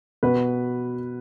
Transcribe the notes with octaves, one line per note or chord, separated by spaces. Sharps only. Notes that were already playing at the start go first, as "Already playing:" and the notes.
B2 B4